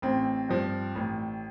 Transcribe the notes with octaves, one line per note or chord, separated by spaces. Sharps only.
A1 C4
G2 F3
A1